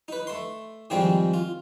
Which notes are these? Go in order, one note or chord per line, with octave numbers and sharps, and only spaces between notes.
D#4 B4
A3 C6
G#2 D#3 F3 G3 C4 G#4
F4